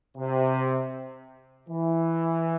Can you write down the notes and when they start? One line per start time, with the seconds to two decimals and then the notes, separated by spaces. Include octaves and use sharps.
0.17 C3
1.69 E3